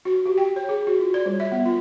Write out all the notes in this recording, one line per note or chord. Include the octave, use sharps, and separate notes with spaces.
F#4
G4
G5
C#5
G#4
F#4
F4
D5
G3
E5
B3
F4